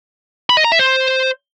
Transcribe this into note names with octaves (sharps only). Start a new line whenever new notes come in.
B5
D#5
A#5
E5
C5